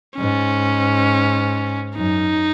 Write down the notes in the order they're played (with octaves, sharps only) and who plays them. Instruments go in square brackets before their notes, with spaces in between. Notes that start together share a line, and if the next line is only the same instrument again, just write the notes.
[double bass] G#2 [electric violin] C#4
[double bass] F#2 [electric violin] D#4